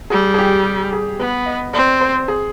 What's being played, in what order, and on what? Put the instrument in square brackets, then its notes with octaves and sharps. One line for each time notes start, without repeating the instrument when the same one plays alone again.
[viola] G3 [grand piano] G#4
[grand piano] G#4
G4
G#4
[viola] B3 [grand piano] B4
[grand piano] D#5
[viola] C4 [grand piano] D5
[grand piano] C5
G#4